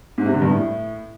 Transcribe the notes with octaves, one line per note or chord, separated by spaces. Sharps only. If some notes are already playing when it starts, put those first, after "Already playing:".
G#2
C3
D3
G2
A2